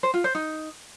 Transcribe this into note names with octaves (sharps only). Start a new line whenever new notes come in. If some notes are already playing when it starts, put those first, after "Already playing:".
C5
F4
C5
D#4